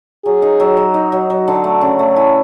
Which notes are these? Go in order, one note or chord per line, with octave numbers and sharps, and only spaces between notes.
F#3 G#4
D#4
F#3
F#3
D#4
F#3
F#3
D3
A3
C#3
A3
E3